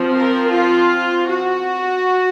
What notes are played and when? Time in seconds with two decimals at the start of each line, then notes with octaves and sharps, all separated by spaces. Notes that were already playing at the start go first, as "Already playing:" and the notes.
Already playing: F3 C4
0.15 A#4
0.52 F4
1.29 F#4